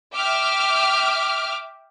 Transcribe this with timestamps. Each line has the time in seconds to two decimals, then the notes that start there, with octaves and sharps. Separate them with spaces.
0.14 E5 G5 D6 F6